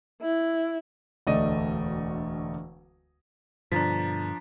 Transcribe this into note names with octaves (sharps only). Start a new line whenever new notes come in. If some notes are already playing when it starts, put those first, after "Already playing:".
E4
E1 D2 A3 D5 D#5 D#7
G2 B2 D3 F3 D4 A#5 A6 B6